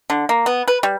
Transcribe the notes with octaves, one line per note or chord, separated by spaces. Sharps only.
D3
A#3
B3
B4
G3